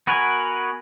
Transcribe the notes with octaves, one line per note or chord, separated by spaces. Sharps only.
B3 F#4 A#4 B4 G#5